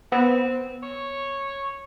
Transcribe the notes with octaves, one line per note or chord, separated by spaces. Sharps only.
B3 C4
C#5